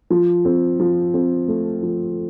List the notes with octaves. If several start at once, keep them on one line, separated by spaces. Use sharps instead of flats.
F3
C4
F3
C4
A3
F3